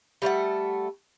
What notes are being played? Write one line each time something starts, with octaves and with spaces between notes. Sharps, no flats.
G3 A3 C#5 F#5